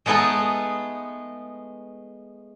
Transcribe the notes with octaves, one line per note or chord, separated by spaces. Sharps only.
G#3 A3 B3 D#4 G#4 A4